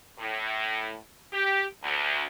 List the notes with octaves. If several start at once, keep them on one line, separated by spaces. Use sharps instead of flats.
A2
G4
D2